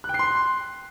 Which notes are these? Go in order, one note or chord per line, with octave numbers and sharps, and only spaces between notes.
F#6
G5
C7
C6